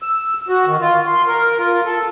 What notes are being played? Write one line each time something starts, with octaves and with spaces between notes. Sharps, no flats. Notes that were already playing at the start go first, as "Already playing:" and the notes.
E6
F#4
D#3
F4
C6
A#4
F4
A4